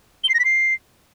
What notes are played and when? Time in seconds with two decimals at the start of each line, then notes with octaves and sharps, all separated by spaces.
0.24 G7
0.29 C7
0.34 A#6
0.39 B6
0.45 C7